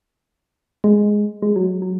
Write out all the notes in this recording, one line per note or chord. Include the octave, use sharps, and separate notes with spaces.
G#3
G#3
F#3
F#3